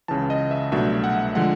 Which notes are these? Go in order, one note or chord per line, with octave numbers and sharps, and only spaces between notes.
C#2 C#3 E3 A5
D#5
E5
C2 B2 F#3 A3 D4 E5
F#5
D3 F3 G#3 F#5